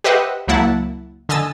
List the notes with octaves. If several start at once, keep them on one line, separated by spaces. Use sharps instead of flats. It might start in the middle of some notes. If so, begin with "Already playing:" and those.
G4 B4 C5 D#5 E5 F#5
C#2 F#3 A#3 E4 F#5 A5
D3 D#5 G#5 E6 A6